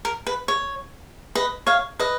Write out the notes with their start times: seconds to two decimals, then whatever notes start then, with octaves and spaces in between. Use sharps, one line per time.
0.05 A#4
0.27 B4
0.48 C#5
1.35 B4 D#5
1.67 C#5 F5
1.99 B4 D#5